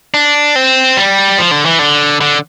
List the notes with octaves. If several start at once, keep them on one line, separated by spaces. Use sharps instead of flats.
D4
C4
G3
F3
D3
E3
D3
D3